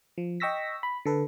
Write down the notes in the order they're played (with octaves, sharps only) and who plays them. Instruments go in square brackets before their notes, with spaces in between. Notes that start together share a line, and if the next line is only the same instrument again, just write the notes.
[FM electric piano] F3
D#5 G5 C#6 E6 A#6 B6
B5
D3 A4 B4